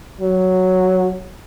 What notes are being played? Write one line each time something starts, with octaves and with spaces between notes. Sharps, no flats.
F#3